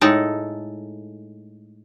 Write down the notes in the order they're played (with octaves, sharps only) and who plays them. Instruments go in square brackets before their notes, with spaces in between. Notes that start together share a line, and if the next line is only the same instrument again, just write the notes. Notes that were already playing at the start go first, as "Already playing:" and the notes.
[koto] A2 G#3 D#4 A4